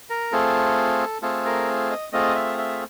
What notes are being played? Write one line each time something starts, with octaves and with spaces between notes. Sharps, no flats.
A#4
A3 C4 F4 G#4 A4
A3 C4 F4 G#4 A4
A#4
D#5
A3 C4 F4 G#4 D#5
E5
E5